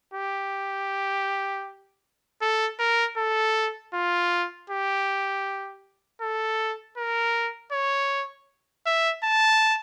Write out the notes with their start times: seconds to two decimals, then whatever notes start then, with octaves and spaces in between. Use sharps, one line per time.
0.14 G4
2.41 A4
2.79 A#4
3.17 A4
3.94 F4
4.70 G4
6.21 A4
6.98 A#4
7.72 C#5
8.86 E5
9.24 A5